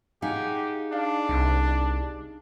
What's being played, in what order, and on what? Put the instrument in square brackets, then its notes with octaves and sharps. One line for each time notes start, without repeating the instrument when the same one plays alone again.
[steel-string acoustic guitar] D#4 G#4 [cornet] G4 [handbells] F5 F#5
[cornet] D4 [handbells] F5
[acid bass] C2